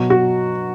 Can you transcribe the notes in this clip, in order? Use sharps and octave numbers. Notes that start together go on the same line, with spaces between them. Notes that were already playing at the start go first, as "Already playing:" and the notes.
Already playing: B2 F#3 F#4
F#4